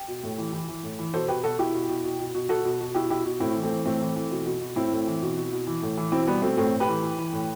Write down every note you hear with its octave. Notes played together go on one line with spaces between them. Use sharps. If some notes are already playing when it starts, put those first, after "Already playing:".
Already playing: G4
B2
A2
E3
E3
E3
A2
E3
B2 A4 C5
B2 G4 B4
B2 F#4 A4
B2 E4 G4
B2
B2
B2
B2
B2
B2 F#4 A4
B2
B2
B2 E4 G4
B2 E4 G4
B2
A2 C4 E4
E3
A3 C4
E3
A2 A3 C4
E3
E3
B2
B2
B2
A2 C4 E4
A2
E3
B2
B2
B2
E3
A2
E3
B2 C4 E4
B2 G3 B3
B2 A3 C4
A2 A3 C4
A2
G4 B4
E3
E3
E3
A2